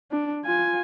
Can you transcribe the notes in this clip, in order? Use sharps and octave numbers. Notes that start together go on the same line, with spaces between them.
D4
F4 G#5